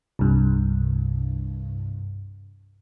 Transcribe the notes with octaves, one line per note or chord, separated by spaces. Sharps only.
C2 G2